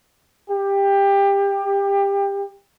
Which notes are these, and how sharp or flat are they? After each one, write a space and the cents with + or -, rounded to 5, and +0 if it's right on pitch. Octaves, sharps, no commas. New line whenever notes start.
G4 +20